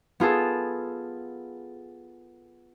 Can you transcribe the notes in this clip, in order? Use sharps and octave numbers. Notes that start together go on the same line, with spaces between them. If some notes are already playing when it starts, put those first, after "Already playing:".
B3 F4 G#4 A4